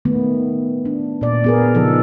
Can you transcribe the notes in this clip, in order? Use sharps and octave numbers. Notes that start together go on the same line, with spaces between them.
D#3 A3 B3
D4
A#2 D5
B3 G#4 A#4
C#3 F3 D#4 A4